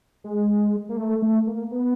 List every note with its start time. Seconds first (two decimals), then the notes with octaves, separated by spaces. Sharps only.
0.24 G#3
0.89 A#3
0.97 A3
1.22 A3
1.47 A#3
1.71 B3